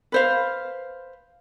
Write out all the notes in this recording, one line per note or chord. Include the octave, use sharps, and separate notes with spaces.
B4 C5 F5